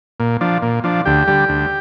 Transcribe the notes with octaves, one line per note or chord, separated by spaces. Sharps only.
A#2
F3 D4
A#2
F3 D4
D2 G4
D3 G3
D2